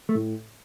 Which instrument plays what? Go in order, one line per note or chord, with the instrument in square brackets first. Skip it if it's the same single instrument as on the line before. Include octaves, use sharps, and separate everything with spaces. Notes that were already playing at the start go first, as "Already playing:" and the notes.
[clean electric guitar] A3
[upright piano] A2